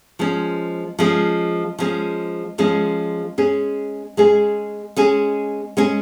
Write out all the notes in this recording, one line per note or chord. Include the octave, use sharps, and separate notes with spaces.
F3 G#3 C#4
F3 G#3 C#4
F3 G#3 C#4
F3 G#3 C#4
G#3 C#4 G#4
G#3 C#4 G#4
G#3 C#4 G#4
G#3 C#4 G#4